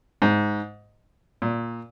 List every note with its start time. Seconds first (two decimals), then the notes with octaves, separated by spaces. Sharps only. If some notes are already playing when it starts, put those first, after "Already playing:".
0.22 G#2
1.42 A#2